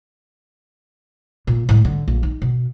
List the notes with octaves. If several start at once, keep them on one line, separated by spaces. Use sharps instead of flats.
A#2
A2 G#3
D3
A#1
D#4
B2